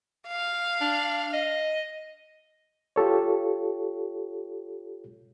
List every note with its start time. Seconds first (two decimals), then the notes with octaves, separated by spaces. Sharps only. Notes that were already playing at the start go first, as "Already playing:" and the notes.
0.27 F5
0.81 D4
1.33 D#5
2.96 F4 G4 A4 C#5